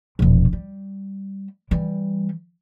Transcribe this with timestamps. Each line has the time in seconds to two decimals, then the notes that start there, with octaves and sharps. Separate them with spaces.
0.19 E1 A#1
0.53 G3
1.71 E3 G3